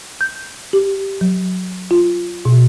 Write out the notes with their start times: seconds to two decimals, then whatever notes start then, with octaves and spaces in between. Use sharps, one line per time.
0.21 G6
0.73 G4
1.21 F#3
1.91 F4
2.45 B2